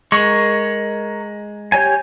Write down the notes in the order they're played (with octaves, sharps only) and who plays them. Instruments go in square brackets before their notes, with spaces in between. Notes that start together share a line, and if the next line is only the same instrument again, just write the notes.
[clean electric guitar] G#3 [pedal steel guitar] A#4 C#6
[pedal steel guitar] G4 C#5 G#5